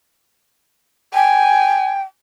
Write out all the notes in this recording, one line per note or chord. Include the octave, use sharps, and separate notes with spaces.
G5 G#5